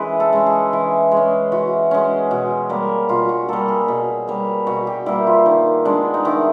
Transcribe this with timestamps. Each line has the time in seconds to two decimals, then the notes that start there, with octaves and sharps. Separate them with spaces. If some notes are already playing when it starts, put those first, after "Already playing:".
Already playing: E3 G#3 C#4 B4
0.20 A4
0.33 G#3 C#4
0.46 G#4
0.73 E3
1.11 G#3
1.17 C#4
1.52 E3 F#4
1.91 G#3 C#4
2.31 B2
2.69 G3 A#3
3.09 B2 F4
3.29 F#4
3.48 G3 A#3 A4
3.68 G#4
3.88 B2
4.28 G3 A#3
4.67 B2 F#4
4.87 G4
5.06 G3 A#3 E4
5.27 F4
5.46 D#3
5.85 G#3 B3 D4
6.14 D#4
6.25 D#3 E4